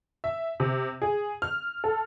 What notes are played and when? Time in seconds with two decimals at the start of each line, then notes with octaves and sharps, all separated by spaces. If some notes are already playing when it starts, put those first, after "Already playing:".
0.24 E5
0.60 C3
1.02 G#4
1.42 F6
1.84 A4